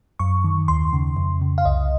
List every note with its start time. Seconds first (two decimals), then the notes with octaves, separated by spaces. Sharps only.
0.19 F#2 C#6
0.44 D#3
0.68 D#2 C6
0.93 C#3
1.17 F2
1.41 C#3
1.58 F5
1.65 C2 D#5